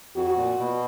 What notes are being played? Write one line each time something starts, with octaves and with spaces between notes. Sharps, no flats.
F2 F#4
A#2
B2